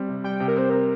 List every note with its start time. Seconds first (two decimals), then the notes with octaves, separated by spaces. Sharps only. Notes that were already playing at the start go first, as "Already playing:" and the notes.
Already playing: G3 C4
0.09 C3
0.24 G3 G5
0.40 C3
0.48 A#4
0.56 C4 C5
0.70 C4 A#4